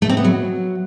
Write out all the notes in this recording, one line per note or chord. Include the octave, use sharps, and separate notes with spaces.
A3
C4
B3
F#3